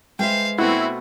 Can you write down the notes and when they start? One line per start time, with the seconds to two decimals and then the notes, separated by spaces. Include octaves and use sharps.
0.19 G#3 B4 C5 E5 F5 G5
0.58 B2 A3 C4 E4 F#4 F#5